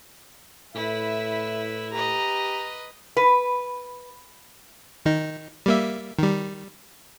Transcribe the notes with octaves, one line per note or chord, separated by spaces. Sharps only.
A2 E4 B4 E5
G4 B4 D#5 A#5
B4
D#3 D#4
G3 A#3 E5
D#3 G3